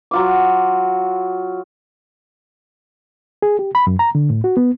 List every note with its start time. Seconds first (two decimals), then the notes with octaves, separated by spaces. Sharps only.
0.11 F#3 F4 D6
3.42 G#4
3.59 G4
3.75 B5
3.87 F#2
3.99 A#5
4.15 D3
4.30 A2
4.44 F#4
4.57 B3